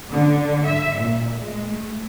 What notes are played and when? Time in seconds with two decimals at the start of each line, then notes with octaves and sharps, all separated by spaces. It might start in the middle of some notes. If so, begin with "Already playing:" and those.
0.10 D3
0.65 E5
0.98 A#2
1.39 G#3
1.70 A3